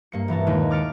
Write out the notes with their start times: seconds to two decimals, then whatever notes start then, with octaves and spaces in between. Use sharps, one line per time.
0.12 G2 A#3 C#7
0.28 E1 E3 A#4 A5
0.47 D#2 A#2 D#3 G#3 A#3
0.71 D6 F6 A6 C#7 D7